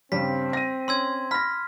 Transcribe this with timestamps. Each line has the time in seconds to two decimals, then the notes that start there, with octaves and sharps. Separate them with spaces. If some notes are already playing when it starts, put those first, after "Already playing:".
0.12 G2 C#3 G3 C4 B6
0.53 A#6 D#7
0.88 C#4 C6 E6 G#6
1.31 B5 F6 A#6 B6